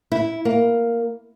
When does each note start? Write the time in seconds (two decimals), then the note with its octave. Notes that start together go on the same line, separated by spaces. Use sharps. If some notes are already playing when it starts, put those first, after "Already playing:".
0.12 E4
0.45 A#3